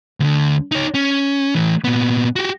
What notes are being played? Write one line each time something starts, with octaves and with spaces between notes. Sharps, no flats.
D2 D3
D#4 C#5
C#4
E3 A3
A#2 B3
F#4 G4